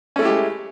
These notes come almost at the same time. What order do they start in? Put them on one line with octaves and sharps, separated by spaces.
C#4 A3 E4 G4 G#3